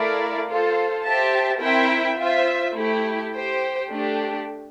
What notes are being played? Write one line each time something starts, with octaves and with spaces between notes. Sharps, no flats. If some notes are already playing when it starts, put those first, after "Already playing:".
Already playing: A3 E4 A#4 D5 F5
F4 A4 C5
G4 C5 E5 A5
C4 E4 A#4 E5 G5
F4 C5 E5
A3 E4 G4
G4 C5 G5
A3 D4 G4